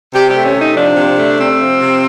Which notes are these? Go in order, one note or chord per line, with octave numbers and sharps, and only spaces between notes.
C3 G4
G4
A3
C#4
C3
D#4
F3 D4
C3
A3
C3 C4
F3
C3